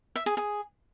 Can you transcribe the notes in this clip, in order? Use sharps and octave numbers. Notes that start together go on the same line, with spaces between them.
E5
G#4
G#4